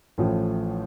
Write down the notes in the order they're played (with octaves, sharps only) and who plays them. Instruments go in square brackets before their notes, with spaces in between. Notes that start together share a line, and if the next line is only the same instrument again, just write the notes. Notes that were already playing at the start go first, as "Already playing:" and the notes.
[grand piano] A1 A2 F3